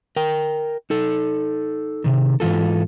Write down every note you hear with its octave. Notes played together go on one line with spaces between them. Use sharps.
A#4 G5
D#4 A4
C3 D#3
G#2 E3 F4 A4